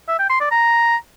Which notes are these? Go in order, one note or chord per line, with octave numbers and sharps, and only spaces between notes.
E5
G5
C6
D5
A#5